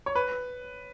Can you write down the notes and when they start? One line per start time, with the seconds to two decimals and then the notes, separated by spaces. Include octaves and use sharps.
0.06 C#5
0.15 B4